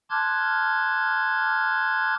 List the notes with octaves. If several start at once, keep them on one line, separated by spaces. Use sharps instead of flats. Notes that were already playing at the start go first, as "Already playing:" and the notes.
A5 C6 D6 F6 F#6 G#6